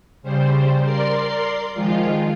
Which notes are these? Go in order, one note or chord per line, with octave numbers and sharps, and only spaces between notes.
C#3 G3 C5
A#4 D5 C6 C7
D#3 F3 G#3 F4